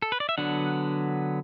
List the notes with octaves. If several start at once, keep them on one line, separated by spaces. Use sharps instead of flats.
A4
B4
D5
E5
D3 F#3 B3 D4 F#5